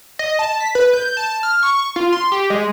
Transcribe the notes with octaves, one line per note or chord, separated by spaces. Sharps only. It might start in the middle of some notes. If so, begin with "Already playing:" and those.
D#5
A5
B6
B4
G6
A5
F6
C#6
F4
C6
G4
G#3